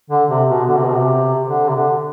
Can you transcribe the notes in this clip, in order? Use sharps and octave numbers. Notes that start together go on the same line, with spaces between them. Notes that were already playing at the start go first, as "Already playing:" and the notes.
D3
C3
B2
D3
C3
B2
C3
D3
C3
D3